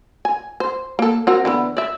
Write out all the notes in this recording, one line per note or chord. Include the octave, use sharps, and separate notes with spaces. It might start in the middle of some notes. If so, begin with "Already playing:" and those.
G#5
C5
A#3 A4
C4 F#4 A#4
D3 E3 B3
D5 E5